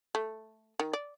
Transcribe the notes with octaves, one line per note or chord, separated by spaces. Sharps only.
A3
D#3
D5